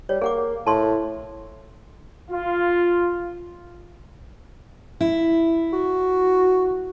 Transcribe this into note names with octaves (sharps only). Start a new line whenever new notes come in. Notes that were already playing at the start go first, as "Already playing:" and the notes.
G3 C#5
A#3 G#4 F#5 D6
A2 A5 C6
F4
E4
F#4